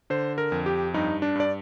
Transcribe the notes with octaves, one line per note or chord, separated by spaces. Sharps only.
D3 C5
A#4
F2
G4
G2 D#4
D4
G2 D5